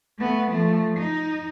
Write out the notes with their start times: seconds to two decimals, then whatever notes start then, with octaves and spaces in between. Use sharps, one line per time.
0.19 A3 B3
0.50 F3 A3
0.98 D#4